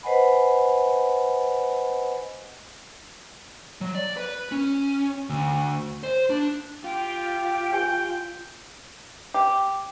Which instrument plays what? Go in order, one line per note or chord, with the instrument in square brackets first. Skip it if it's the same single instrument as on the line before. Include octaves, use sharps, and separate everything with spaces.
[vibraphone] B4 C5 D#5 F#5 G#5 B5
[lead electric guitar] F#3
D5
B4
C#4
D2
C5
D4
[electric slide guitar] F4 [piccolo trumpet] G4 [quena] G5
[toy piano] G4 G#5 [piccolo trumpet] G6
[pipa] G4